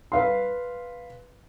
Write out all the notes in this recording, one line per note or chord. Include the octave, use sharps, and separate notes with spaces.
B4 F5 C6